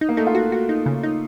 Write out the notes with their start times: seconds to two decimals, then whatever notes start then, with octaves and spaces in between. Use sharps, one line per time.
0.01 D#4
0.09 A#3
0.17 A3 D#4
0.27 F4
0.35 F#4
0.52 F#4
0.69 D#4
0.86 C#3
1.03 D#4